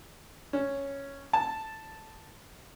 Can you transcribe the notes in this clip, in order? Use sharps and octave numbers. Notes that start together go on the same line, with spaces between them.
C#4
A5